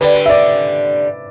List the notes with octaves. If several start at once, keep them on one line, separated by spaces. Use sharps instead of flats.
D3 G3 B4
E5
D5